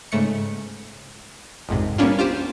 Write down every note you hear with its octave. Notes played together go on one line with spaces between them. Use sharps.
G#2 C#3 A3 C#7
A#1 F2 G#2 C3
G3 A#3 B3 C#4 D4 F4
F4 G4 C5